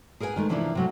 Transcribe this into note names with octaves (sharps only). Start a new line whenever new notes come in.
G#4 A#4 B4 F5 G#5
D#3 G#3 A3
C3 E3 F3 A#3 D4 E4
C3 F#3 A3